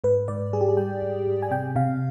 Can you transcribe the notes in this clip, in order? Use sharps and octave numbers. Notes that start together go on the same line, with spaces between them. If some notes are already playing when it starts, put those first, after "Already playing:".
G#2 B4
G#2 D5
G3 G#4
G4
G#4
G3 G5
G#2
G#2
G#5
C3 G5
C3 F5